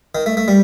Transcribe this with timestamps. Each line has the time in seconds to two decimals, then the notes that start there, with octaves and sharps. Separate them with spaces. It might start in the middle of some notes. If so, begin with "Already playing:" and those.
0.15 D#3
0.26 A3
0.37 A3
0.48 G3